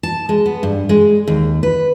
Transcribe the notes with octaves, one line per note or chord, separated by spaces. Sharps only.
A5
G#3
B3
G2
G#3
D#2
B4